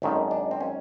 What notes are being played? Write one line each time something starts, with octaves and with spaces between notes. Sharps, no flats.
G#1 F#2 D#3 A3
D4
C4
C#4